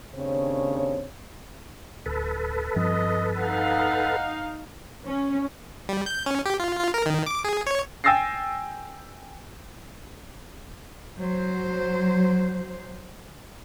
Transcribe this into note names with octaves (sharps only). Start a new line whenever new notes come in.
D#2 C#3 C4 D4 C#5
D1 A4 B4
G2 F3 C4 D#5
D#4 F5 F#5
C#4
G3
G6
C#4
G4
F4
F4
A#4
D#3
D6
G#4
C#5
G5 G#5 E6 A6 A#6 C7
F#3 C5